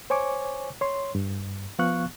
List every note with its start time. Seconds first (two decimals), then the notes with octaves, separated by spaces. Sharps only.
0.10 C5 C#5 G#5 C#6 D6
0.81 C#5 C6
1.15 G2
1.79 F3 B3 F5 C#6 F#6